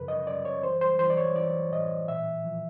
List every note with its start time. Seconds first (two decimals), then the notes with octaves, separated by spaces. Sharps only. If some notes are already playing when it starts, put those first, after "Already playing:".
Already playing: F#2 C#3 F3 A#4 B4
0.08 D#5
0.27 F#2 D5
0.45 C#5
0.63 E3 C5
0.81 C5
0.99 E3 C5
1.10 D5
1.17 C#5
1.36 E3 D5
1.72 A2 D#5
2.08 A#2 E5
2.45 F3